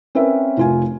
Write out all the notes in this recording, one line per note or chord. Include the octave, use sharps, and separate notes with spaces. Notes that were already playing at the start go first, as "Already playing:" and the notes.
C4 C#4 A#4 B4 E5
F1 F4 G#5